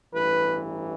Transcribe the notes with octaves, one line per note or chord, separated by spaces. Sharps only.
A1 G2 E3 B4